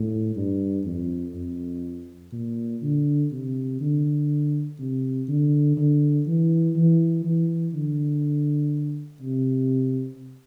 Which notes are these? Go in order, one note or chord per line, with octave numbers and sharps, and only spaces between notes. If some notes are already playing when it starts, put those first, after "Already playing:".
Already playing: A2
G2
F2
F2
A#2
D3
C3
D3
C3
D3
D3
E3
E3
E3
D3
C3